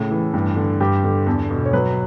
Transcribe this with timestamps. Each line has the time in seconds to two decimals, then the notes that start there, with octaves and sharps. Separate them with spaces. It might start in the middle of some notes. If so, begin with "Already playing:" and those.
Already playing: A2 C#3 A4
0.11 E3
0.34 G2
0.57 D3
0.80 G2 G4
1.04 D3
1.27 E2 A4
1.50 B2
1.65 C#5
1.73 F#3 B4